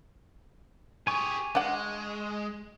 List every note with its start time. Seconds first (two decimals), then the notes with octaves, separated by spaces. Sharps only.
1.07 G4 G#4 G#5 C#6
1.55 G#3 D4 F#5